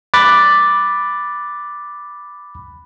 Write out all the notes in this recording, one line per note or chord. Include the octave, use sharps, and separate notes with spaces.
B5 D6 F#6 A6